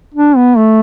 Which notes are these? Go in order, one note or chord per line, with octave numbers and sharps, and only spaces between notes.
D4
B3
A3